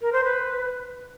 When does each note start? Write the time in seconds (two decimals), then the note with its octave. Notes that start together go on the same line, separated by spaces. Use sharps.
0.01 A#4
0.12 C5
0.24 B4